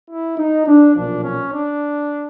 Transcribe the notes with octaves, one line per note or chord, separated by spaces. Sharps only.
E4
D#4
D4
B1 A#2 F3 D4
C#4
D4